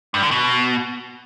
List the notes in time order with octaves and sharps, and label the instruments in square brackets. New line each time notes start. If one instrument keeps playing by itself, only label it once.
[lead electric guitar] G2
D3
B2